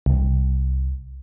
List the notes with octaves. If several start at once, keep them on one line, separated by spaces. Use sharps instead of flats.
C2